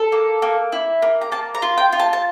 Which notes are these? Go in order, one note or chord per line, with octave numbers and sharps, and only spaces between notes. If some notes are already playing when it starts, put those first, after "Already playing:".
Already playing: A4
A#3
A#3
E4
A#3
A#5
A#3 A5
A#5
F4
G5
F4
A5
A5